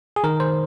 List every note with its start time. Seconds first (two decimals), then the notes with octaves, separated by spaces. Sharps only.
0.16 G#4
0.24 D#3 A#4
0.40 C5